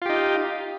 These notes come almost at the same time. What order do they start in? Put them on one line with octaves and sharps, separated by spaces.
F4 G4 D#4